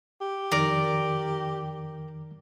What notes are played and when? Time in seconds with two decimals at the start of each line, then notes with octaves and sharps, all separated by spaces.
0.21 G4
0.52 F2 D#3 A#4 D5 D6